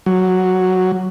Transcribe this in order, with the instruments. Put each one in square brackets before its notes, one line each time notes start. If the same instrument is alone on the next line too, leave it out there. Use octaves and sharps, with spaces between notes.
[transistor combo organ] F#3